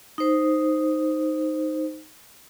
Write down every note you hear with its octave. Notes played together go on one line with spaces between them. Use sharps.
D#4 C5